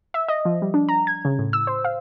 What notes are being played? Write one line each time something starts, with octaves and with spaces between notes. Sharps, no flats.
E5
D#5
F3
G3
D4
A#5
G#6
C#3
A2
E6
C5
F5